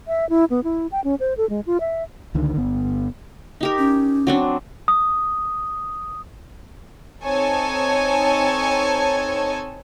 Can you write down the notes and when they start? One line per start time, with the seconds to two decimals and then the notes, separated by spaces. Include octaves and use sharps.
0.08 E5
0.30 E4
0.50 B3
0.64 E4
0.92 G5
1.04 C#4
1.20 C5
1.37 A4
1.50 G#3
1.66 F4
1.80 E5
2.34 C#2 D3 D#3
2.57 G1 B3
3.61 D#4 G4 A#4
3.78 C#4
4.27 F#3 C4 D4
4.88 D#6
7.25 C4 D#4 A4 C#5 G#5 A5